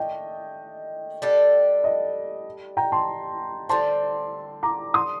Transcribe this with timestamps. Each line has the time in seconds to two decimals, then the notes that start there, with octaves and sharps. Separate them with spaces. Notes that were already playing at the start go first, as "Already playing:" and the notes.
Already playing: D#3 A3 D4 D#5 G5
1.22 G3 D4 A4
1.84 D#5
2.77 G5 A#5
2.92 A5 C6
3.69 D3 G3 C4 A5 C6
4.63 A#5 D6
4.94 C6 D#6